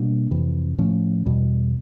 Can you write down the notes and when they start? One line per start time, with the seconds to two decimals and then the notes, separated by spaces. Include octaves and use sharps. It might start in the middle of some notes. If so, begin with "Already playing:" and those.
Already playing: B2 G3 A#3 D4
0.31 F2 C3 E3
0.78 A2 F3 A3 C#4
1.26 E2 B2 G3